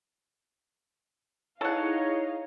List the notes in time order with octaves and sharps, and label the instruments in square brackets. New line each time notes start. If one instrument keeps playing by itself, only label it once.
[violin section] D#4 D#5 F5 [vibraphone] E4 G#4 [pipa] A4 F#5 [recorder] C#5